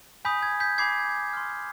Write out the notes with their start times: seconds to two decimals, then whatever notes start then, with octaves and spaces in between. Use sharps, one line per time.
0.25 G#5 B5 D#6 G6 B6
0.43 G#6
0.60 G6 B6
0.78 G#5 B5 D6 G#6 C7
1.33 C6 F6